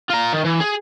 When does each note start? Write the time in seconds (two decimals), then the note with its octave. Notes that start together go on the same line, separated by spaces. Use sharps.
0.10 F4 A#5
0.34 D#3
0.46 E3
0.61 G#4